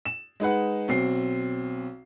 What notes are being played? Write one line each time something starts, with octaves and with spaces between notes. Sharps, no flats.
E7
G#3 D#4 B4 F#5
B1 B2 C4 C7